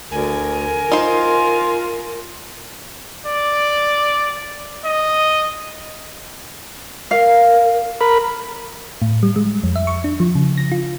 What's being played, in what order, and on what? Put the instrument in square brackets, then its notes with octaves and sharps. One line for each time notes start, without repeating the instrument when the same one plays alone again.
[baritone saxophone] D2 [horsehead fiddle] A#4 [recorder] G#5
[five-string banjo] D#4 C5 [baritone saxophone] F4
[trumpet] D5
D#5
[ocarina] A#4 [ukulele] F5
[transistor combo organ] A#4 B5
[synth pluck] A2
G3
G#3
F2
E5
C#6
D4
F3
C#3
A#6
F4